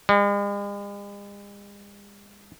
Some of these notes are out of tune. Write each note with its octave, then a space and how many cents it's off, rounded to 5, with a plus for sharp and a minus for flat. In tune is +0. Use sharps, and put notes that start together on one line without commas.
G#3 -45